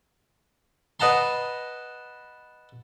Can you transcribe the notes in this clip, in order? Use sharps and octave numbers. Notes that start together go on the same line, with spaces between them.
B4 D#5 F#5 A5 A#5 C6